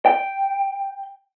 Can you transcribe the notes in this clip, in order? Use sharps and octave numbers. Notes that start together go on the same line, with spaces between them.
G5